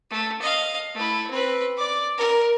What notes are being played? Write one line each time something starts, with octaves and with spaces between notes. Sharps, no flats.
A3
D#5 F5
A3 E4
C4 B4
D5 D6
A#4